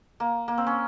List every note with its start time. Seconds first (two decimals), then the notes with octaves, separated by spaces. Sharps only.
0.20 A#3
0.48 A#3
0.58 C4
0.67 C#4